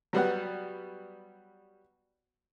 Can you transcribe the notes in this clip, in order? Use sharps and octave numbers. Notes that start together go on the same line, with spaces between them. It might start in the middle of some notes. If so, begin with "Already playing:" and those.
F#3 G3 B3 F#5